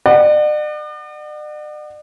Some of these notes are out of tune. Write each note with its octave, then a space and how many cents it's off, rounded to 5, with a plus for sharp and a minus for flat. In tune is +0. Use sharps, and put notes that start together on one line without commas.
D5 +45 F#5 +0